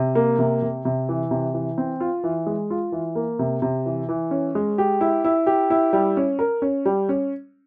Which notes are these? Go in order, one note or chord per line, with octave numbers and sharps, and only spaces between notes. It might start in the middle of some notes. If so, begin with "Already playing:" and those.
Already playing: C3
A#3
C3
C3
C3
E3
C3
E3
C4
F4
E3
G#3
F4
E3
A#3
C3
C3
E3
E3
C#4
G#3
G4
E4
E4
G4
E4
G3
C#4
A#4
C#4
G3
C#4